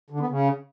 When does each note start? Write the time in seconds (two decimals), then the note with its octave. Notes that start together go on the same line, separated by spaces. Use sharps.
0.10 D3
0.19 B3
0.29 C#3